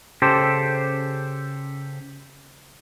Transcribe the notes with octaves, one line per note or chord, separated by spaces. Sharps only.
C#3 G4 A4 C5